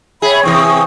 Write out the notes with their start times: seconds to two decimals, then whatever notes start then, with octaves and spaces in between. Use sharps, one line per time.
0.22 G#4 C#5 E5 B5
0.43 C3 E3 C4 C#6 D#6